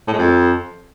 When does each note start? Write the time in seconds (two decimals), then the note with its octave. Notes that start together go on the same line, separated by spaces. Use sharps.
0.08 A2
0.13 G#3
0.18 F2